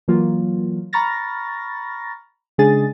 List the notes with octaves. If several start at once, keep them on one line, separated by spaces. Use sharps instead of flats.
E3 F#3 A#3 F4
A#5 B5 C#6 F6 A6 A#6
C#3 G#3 D4 G#4 G#5 A6